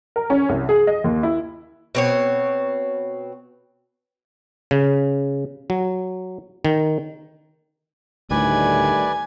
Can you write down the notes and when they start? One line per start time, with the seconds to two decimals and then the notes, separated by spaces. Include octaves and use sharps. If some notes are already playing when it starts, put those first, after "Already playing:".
0.16 A#4
0.30 C#4
0.49 C2
0.69 G#4
0.87 D#5
1.04 D#2
1.23 E4
1.95 B2 C4 C#5
4.71 C#3
5.70 F#3
6.65 D#3
8.31 D2 A2 D#3 G3 A3 B4 D5 G#5